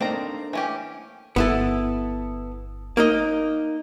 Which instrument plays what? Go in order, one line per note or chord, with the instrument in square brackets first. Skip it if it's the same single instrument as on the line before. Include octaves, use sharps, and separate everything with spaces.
[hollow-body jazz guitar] A3 A#3 D4 [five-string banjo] C4 D#4 A#5
[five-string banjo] E3 C#4 G4
[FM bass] G1 [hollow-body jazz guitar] B3 E4 A4
[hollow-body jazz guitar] A#3 D#4 D#5